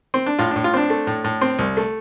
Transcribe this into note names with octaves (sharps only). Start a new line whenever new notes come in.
C4
D4
A2 F4
D4
A2
F4
C4 D4
A3
A2
A2
C4
C2
A3